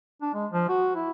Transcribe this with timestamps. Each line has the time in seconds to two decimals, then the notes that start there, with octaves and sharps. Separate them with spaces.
0.22 D4
0.34 G#3
0.52 F3
0.69 F#4
0.95 E4